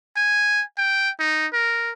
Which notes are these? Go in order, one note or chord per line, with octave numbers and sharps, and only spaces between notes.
G#5
G5
D#4
A#4